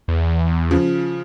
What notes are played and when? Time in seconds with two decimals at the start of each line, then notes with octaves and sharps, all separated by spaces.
0.08 E2
0.71 C#3 F3